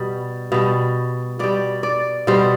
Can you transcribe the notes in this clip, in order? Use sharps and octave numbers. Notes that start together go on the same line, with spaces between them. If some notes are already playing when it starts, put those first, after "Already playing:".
Already playing: B2 G3
B2 G3
B2 G3 D5
D5
B2 G3 C5